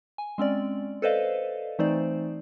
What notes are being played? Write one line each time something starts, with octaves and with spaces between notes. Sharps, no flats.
G#5
G#3 C4 C#4 D5
A4 B4 C5 D5 D#5 F5
E3 A3 C4 D#4 C5 D5